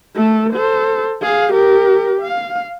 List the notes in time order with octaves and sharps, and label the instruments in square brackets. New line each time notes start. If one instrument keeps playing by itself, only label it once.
[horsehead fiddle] A3 A4
A4 C5
G#4 F5
G4 A#4
F5